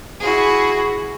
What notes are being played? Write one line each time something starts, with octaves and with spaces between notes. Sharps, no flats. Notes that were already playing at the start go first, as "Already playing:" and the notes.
E4 F#4 G#4